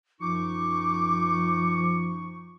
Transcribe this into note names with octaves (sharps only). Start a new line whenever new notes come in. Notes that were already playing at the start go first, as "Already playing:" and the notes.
F#2 F3 D#4 C#6 D6